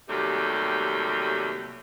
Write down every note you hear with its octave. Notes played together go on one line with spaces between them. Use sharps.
D#2 C3 F#3 G3 A3